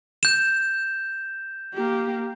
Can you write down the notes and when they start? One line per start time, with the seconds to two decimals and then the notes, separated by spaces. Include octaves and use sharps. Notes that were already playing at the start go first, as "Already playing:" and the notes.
0.23 G6 E7
1.74 A#3 G4